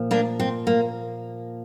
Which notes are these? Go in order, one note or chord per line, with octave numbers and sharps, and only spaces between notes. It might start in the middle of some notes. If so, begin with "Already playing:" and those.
Already playing: A#2 F3
A#3 D4
C4
A#3